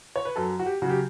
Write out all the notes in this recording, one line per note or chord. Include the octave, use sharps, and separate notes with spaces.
C#5
B4
F#2 A4
F#4
G4
C#3 F#3 F#4
G4